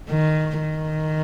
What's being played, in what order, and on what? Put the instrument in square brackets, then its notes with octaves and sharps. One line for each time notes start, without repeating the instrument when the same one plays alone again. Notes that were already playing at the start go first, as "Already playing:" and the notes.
[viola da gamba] D#3
D#3